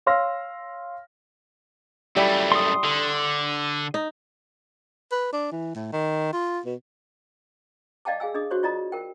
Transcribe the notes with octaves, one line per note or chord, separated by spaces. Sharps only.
C#5 F5 C6 E6 F6 A#6
F#2 G3 A3 E4
C6 D#6
D3
D#4
B4
D4
E3
A2
D#3
F4
B2
D5 D#5 F5 G5 A5 D6
G#4 F5 G#5 E6
D4 G#4 D#5 D#6
F#4 C5 C#5 C#6
F4 D5 D#5 A#5 D#6
A#4 G5